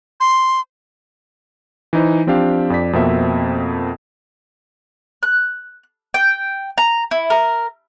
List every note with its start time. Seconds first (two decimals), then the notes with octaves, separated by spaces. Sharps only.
0.20 C6
1.93 E3 D#4 C5
2.27 F3 C4 D4 G4 F5
2.70 F2 D5 B6
2.93 F2 B2 A#3 C4 E5
5.23 F#6
6.14 G5
6.78 A#5
7.11 E4
7.30 A#4